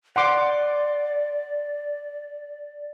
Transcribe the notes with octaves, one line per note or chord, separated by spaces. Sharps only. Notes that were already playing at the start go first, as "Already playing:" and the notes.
D5 F#5 C6 D6